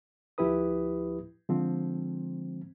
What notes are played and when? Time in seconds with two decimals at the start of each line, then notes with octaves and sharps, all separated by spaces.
0.38 D2 F3 E4 G4 B4 D#6
1.49 D3 F3 G#3 C4